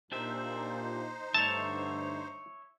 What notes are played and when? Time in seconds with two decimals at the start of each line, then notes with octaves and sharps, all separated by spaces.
0.12 A#2 D4 D#4 G4 C5 E5
1.34 G2 D3 A3 C#5 E5 A5